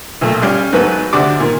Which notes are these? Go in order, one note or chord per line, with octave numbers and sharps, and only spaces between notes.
B1 A#2 A3
G3 C#4 G4 F5
G#2 F#3 A3 B3 B4
D2 C3 D4 F#4 D6
A#2 D#3